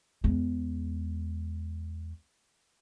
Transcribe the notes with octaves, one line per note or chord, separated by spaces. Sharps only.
E2 G#3